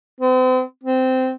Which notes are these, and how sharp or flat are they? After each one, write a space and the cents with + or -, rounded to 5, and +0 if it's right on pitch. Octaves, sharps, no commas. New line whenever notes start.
C4 -40
C4 -15